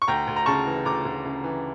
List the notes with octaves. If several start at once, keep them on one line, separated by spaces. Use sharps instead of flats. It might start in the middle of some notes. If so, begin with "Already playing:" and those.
C#6
D2 G5 A#5
D2
A#5
C#3 A5 C#6
E3
D2 A#5 D6
D2
C#3
E3